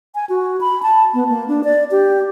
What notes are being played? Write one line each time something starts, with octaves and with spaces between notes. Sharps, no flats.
G#5
F#4
B5
A5
B3
A#3
D4
D5
G4